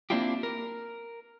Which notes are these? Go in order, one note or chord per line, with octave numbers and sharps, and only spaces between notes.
A#3 C4 D4 E4 F4 G4
A#4